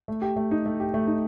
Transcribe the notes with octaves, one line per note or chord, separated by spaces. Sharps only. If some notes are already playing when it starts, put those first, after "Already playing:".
A3
G4
A3
D#4
A3
G4
A3
D#4